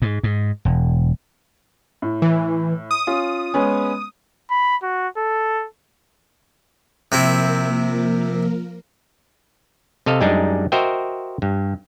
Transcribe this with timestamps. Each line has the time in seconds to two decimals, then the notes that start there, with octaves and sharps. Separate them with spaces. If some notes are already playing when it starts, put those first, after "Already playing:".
0.02 G#2
0.24 G#2
0.65 E1
2.02 A2
2.22 E3
2.91 D#6
3.07 C#4 F4
3.54 G#3 B3 C#4
4.50 B5
4.83 F#4
5.17 A4
7.12 C3 F3 A#3 C4 E4 A#4
10.06 C3 A4 D#5 F5
10.21 F#2 G3 G#3 D4 D#4
10.72 F#4 A#4 C5 D#5 E5 G5
11.42 G2